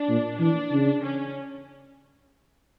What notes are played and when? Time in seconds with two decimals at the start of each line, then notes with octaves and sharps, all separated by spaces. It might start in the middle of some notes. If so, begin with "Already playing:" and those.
Already playing: D4
0.09 A#2
0.40 E3 D4
0.72 C#3
1.03 C#4